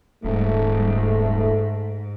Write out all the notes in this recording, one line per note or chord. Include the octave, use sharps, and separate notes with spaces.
D#1 G#2 A3